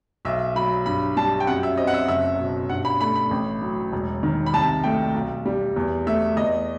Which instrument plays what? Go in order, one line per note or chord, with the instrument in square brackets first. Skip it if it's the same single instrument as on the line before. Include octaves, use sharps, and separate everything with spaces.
[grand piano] B1 E5
F#3 B5
G2 B5
G3 A5
G5
F#2 F#5
E5
C4 D#5
F#5
E5
F#1 E5
B2
G2 F#5
B5
A3 B5
B5
A1
F#3
E1
D#3
B5
C2 A5
A3 G5
B1
G3
E2
A3 E5
E2 D#5